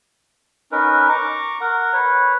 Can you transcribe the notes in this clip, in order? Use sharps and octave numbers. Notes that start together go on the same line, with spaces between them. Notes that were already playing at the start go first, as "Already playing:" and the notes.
C#4 D#4 A#4 B4
A#5 C#6 D6
A#4 F#5
B4 C#5